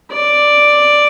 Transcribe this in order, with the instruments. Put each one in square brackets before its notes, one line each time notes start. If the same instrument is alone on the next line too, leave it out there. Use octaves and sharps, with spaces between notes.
[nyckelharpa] D5